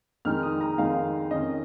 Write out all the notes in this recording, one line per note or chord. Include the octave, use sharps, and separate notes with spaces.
F2 D#3 G#3 D#4 F6
D#6
A#5
F2 D#3 G#3 D#4 F5
F2 D#3 C#4 D#5